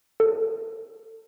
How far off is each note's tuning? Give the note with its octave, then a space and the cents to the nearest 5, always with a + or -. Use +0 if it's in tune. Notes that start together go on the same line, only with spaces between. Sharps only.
A4 +30